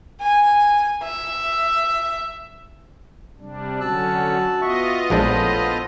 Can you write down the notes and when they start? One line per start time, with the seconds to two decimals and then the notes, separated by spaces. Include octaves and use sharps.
0.21 G#5
1.03 E5
3.40 C3 G3 D4
3.81 D3 F#3 C#4 F#4 A5 E6 F#6
4.61 B3 F4 D#5 E5 C#6
5.10 A#1 A2 G#3 D4 A4 C5 B5